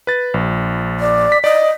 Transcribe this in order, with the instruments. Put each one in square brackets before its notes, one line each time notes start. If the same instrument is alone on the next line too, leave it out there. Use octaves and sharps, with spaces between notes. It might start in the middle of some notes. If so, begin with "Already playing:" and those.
[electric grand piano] B4 A6
A#1
[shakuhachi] D5
[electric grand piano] B6
[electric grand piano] D5 [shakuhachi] D#5